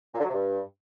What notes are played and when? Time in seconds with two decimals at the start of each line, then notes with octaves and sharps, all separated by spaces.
0.14 A#2
0.19 D3
0.24 F#3
0.29 C3
0.34 G2